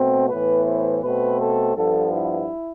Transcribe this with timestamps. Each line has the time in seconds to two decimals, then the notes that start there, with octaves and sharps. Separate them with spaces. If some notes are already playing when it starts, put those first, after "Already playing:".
Already playing: B2 A3 C4
0.29 A2 E3 B3 B4
0.65 C5
1.02 B2 A3 C4 B4
1.39 A4
1.75 G2 F3 B3 A4
2.12 E4